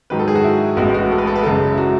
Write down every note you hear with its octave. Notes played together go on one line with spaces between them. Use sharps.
G#2 D#3 F#3 B4
A4
G#4
F#4
E4
A1 A2 G#3 B3 F#4
F#4
A4
B4
A4
B4
F#2 C#3 G#3 A4
E4
F#4